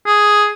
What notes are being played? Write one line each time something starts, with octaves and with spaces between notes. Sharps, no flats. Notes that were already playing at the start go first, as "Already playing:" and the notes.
G#4